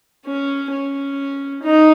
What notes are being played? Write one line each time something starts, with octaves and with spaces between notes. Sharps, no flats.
C#4
C#4
D#4